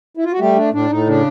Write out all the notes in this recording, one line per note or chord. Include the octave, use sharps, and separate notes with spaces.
E4
F4
F#4
G3 A3 G4
D4
A2 D4
A2 D#4
C#3 D4